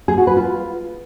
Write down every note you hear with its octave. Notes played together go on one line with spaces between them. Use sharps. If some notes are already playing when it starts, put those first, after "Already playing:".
G#4
F#4
B4
F4